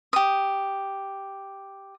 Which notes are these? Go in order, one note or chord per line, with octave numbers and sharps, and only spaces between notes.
G4 D#6